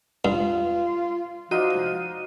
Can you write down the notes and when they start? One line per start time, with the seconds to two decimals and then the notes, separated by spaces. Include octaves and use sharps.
0.25 G2 F4
1.51 F3 D#4 F#4 D5 F5 D#7